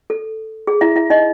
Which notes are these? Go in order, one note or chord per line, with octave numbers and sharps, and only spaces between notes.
A4
G#4
E4 E5
E4 E5
D#4 D#5